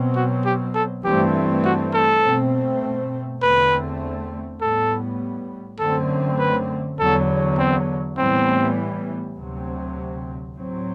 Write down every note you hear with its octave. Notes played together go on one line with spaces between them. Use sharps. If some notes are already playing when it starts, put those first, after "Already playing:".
Already playing: B2 F#3 C4
F#4
G4
A4
G2 E3 A3 C4 G4
F#4
A4
B2 A3 C4
E2 D3 A3 C4 B4
A2 G3 B3 A4
F#2 D3 A3 C4 A4
B4
E2 D3 F#3 A4
C4
A2 E3 G3 B3 C4
D2 C3 F#3 C4
A2 F#3 C4